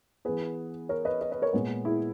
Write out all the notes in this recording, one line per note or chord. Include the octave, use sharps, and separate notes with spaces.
E3 B3 G#4 B4
A#4 C#5
B4 D#5
B4 D#5
B4 D#5
A#4 C#5
A#2 G#3 B3
E4 G#4